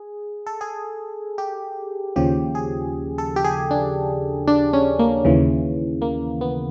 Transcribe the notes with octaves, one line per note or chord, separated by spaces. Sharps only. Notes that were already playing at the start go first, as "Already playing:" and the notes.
Already playing: G#4
A4
G#4
G4
D#2 C#3 F3 G4
G#4
A4
G4
G#4
D4
D4
C#4
A#3
D#2 C#3 E3
A#3
B3